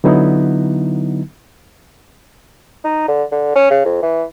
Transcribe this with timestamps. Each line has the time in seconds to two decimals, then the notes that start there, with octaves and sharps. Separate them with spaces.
0.04 D3 F#3 B3 D#4 E4
2.85 D#4
3.08 D3
3.32 D3
3.56 C#4
3.70 C#3
3.85 F2
4.02 E3